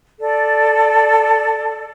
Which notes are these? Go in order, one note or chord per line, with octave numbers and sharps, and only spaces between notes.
A4 D5